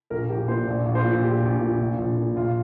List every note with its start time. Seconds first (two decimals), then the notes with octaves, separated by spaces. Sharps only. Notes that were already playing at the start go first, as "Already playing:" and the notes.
0.10 A#1 A#4
0.29 A#1 G4
0.48 A#2 C5
0.67 A#1 D5
0.86 A#1
0.95 C5
1.05 A#2
1.23 A#1 G4
1.42 A#1
1.61 A#2
1.80 A#1
1.98 A#1
2.17 A#2
2.36 A#1 F4